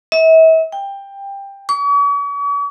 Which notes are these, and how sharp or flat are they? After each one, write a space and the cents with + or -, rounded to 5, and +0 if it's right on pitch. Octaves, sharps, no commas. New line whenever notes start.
E5 -40
G5 +15
C#6 +45